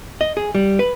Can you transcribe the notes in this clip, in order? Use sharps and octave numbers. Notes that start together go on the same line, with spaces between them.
D#5
G#4
G3
B4